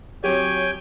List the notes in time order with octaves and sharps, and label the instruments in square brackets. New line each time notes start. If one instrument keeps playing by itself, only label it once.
[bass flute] F#3 [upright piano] C4 G4 [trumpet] C#5 [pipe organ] G5 G#5